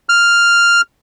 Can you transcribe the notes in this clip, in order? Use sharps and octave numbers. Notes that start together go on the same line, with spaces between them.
F6